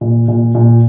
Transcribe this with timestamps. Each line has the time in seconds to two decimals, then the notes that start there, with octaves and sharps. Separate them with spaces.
0.01 A#2
0.28 A#2
0.55 A#2